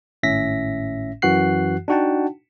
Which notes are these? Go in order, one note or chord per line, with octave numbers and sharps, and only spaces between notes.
G#1 A2 C#4 E5 A#6 B6
F#2 E3 F#4 F#5 F#6 C7
D4 D#4 F#4 F#5 G5 A5